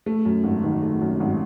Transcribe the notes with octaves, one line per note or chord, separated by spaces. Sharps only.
A3
F#2
G#1
D#3
A3
F#2
G#1